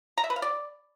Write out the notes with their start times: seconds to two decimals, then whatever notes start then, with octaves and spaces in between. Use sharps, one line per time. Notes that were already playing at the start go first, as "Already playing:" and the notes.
0.18 A#5
0.24 E5
0.30 B4
0.36 F5
0.42 D5